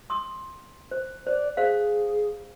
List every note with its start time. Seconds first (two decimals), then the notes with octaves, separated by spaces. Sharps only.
0.10 C6 D#6
0.91 C5
1.27 C5 D5
1.57 G#4 C5 F5